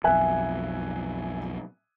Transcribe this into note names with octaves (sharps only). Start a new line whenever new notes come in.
B1 F2 E5 G#5 F#6